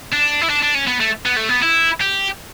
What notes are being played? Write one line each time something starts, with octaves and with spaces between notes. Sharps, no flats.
D4
E4
D4
D4
C#4
B3
A3
B3
A3
B3
E4
G4